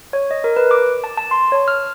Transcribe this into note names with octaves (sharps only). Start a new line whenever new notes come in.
C#5
D#5
A#4
B4
D6
A5
A5
C6
C#5
F6